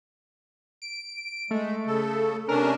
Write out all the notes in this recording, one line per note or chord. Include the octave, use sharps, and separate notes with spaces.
D7
G#3 A3
C#3 A4
C3 C#4 D4 A#4